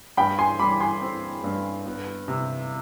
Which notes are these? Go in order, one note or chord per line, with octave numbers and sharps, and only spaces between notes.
G2 G5 B5
G#5 C6
G2 B5 D6
G#5 C6
C4
G2
B3
C3